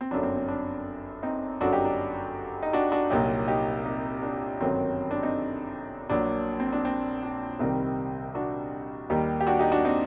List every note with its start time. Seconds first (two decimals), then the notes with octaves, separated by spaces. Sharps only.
0.01 C4
0.11 G1 F#2 F#3 D4
0.23 C4
0.37 C4
0.48 D4
1.23 C4 D#4
1.61 G1 F#2 F#3 D4 F#4
1.73 D#4 G4
1.85 D4
2.63 D#4
2.73 D4 F#4
2.92 D4 F#4
3.10 C2 A#2 F#3 D#4 G4
3.47 D#4 G4
3.85 C4 D#4
4.23 D4
4.60 G1 F#2 D#3 F#3 C4
5.11 D4
5.23 C4 D#4
6.10 A#1 A#2 F#3 D4
6.60 C4
6.73 D4
6.85 C4
7.23 D4
7.59 C2 C3 D#3 G3 C4 D#4
8.35 D4 F#4
9.10 D#2 D#3 G3 D#4 G4
9.40 G4
9.47 D4 F#4
9.59 D#4 G4
9.72 D4 F#4
9.85 C4 D#4